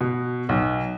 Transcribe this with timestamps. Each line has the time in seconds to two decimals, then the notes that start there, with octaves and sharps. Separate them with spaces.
0.01 B2
0.49 B1